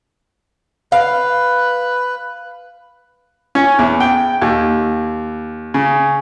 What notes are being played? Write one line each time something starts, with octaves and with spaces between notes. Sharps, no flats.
B4 F5
C#4
E2
G5
D#2
C#3